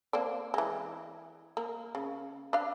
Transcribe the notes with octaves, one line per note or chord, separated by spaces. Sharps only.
A#3 C4 D5
E3 G#3
A#3
C#3
D4 F5